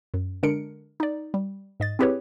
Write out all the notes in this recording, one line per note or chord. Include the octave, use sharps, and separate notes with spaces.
F#2
D3 G#3 D4 A#4 C#7 D7
D#4 D5
G3
G#2 D#5 A6
C4 E4 G4 G#4 B4 C#5